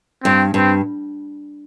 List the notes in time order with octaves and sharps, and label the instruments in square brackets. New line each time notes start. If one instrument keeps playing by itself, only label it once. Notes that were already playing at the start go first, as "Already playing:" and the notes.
[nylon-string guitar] G2 [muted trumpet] C4
[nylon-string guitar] G2 [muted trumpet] C4